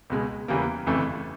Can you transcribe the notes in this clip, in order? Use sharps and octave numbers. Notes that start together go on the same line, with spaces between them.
C#2 B2 G#3
E2 C#3 E3 G3 A#3
G1 F2 C#3 E3 A3